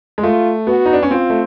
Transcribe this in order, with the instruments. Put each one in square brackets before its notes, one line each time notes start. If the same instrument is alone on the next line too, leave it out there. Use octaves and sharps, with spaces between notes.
[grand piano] G#3
[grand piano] A3 [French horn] F4
[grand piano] B3 [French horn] F#4
[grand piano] D#4
D4
C#4
[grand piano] C4 [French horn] F4
[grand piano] A3